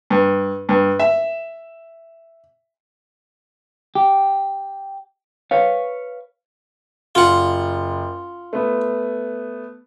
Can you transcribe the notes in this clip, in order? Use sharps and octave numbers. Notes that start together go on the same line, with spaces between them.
G2
G2
E5
G4
B4 C#5 F5
F#1 F4 F#5
A3 B3